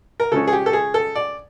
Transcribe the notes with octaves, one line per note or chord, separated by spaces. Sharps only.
A#4
C#3 F3 G#3 C#4 A4
G#4
G4
A4
G#4
A4
D5